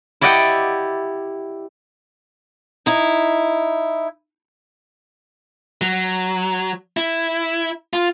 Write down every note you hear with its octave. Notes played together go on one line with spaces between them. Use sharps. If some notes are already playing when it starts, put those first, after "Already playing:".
E4 G4 D5 D#5 F#5 G5
D#4 E4
F#3
E4
F4